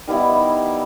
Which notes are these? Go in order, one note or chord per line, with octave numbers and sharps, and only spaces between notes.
D#3 G3 B3 E4